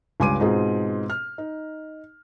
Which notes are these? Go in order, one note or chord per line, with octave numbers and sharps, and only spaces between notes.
C#2 G2 G#5 C6 D6 D#7
G#2 B2 C4 D#4 F4 G#4
F6
D#4